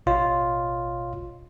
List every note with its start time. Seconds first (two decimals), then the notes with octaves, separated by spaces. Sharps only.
0.06 A1 B2 F4 C#5 D#5